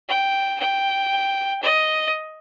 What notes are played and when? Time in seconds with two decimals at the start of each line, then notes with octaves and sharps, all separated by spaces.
0.09 G5
0.60 G5
1.63 D#5